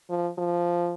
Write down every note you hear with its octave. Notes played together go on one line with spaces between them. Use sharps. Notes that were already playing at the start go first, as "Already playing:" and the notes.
F3
F3